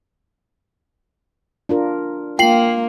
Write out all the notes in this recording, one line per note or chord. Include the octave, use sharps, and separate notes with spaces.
D4 F4 A#4
A#3 F4 G5 C7 F#7